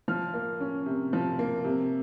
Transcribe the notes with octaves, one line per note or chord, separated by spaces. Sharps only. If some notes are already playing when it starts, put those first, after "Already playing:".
F3 F6
A#3
C#4
C3
F3
A#3
C3